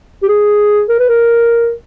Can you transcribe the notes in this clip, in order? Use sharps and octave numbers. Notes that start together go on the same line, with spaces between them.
G4
G#4
A#4
B4
A#4